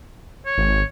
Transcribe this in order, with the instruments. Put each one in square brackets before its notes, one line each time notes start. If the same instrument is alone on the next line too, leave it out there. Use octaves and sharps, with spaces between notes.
[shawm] C#5
[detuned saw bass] G#1